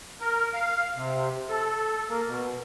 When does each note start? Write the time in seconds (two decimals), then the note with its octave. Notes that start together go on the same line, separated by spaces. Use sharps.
0.21 A#4
0.54 F5
0.96 C3
1.49 A4
2.09 A#3
2.28 B2